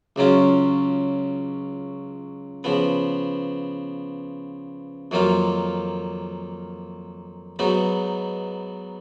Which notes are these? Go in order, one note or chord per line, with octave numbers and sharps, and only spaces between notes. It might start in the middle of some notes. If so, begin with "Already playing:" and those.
C#2 C#3 F#3 C#4 F4
C#3 F3 B3
F2 D#3 F#3 A#3 F4
G#2 F#3 B3 D#4